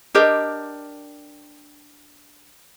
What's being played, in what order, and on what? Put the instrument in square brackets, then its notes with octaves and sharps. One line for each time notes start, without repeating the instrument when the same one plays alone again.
[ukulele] D4 G4 A#4 D#5